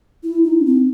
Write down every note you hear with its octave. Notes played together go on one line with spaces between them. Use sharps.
E4
D#4
C#4
C4